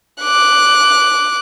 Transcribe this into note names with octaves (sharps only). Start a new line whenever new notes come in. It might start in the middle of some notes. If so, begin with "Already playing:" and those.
D6 F#6